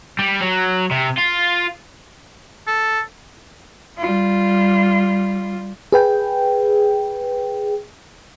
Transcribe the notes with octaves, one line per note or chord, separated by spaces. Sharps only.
G3
F#3
C3
F4
A4
G3 F4
G#4 B4 G5